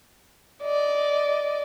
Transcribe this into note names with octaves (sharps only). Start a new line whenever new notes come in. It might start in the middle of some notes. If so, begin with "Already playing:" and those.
D5 D#5